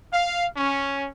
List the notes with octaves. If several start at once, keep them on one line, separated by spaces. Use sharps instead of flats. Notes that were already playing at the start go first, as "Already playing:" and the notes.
F5
C#4